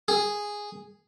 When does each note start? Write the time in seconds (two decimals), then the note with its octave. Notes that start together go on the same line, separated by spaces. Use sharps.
0.08 G#4